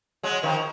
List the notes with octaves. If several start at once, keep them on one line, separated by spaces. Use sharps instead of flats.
F#3 G#3
D#3 F3